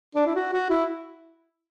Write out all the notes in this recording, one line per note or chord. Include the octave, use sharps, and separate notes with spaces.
D4
E4
F#4
F#4
E4